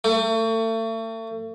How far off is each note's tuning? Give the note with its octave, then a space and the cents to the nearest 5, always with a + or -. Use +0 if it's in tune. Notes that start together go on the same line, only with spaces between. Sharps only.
A3 +35